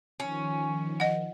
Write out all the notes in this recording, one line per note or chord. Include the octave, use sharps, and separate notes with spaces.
D#3 F3 C#4
D#5 F#5